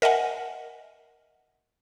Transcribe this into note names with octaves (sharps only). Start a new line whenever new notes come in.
A#4 D#5 E5 F#5 G#5